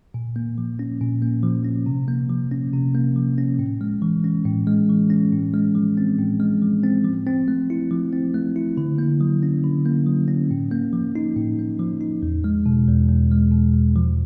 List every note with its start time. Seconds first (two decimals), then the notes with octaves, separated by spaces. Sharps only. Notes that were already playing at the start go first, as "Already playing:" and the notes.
0.14 A#2
0.36 A#3
0.58 F3
0.79 C#4
1.01 A#2
1.22 A#3
1.43 F3
1.65 C#4
1.86 C3
2.08 A#3
2.29 F3
2.51 C#4
2.74 C3
2.95 A#3
3.16 F3
3.38 C#4
3.59 A2
3.81 G#3
4.02 E3
4.24 C#4
4.45 A2
4.67 G#3
4.89 E3
5.10 C#4
5.32 A2
5.54 G#3
5.75 F3
5.97 C4
6.19 A2
6.40 G#3
6.62 F3
6.84 C4
7.05 F3
7.27 C4
7.48 A3
7.70 E4
7.91 F3
8.13 C4
8.34 A3
8.56 E4
8.78 D3
8.98 A#3
9.21 F#3
9.43 C#4
9.64 D3
9.86 A#3
10.07 F#3
10.28 C#4
10.51 A2
10.71 A#3
10.93 F3
11.16 D#4
11.36 A2
11.59 A#3
11.79 F3
12.01 D#4
12.23 E2
12.44 G#3
12.66 B2
12.88 E2
13.09 E2
13.31 G#3
13.52 B2
13.75 E2
13.96 F3